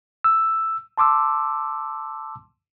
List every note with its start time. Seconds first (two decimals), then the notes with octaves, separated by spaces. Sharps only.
0.24 E6
0.98 A5 C6 D6 E6